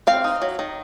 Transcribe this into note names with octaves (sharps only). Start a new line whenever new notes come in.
C4 F5
D#4
F#3
D#3